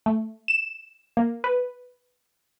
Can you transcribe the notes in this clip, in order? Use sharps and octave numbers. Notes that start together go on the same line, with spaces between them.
A3
E7
A#3
B4